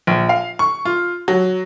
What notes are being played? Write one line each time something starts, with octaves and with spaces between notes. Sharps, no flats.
A#1
F5
C#6
F4
F#3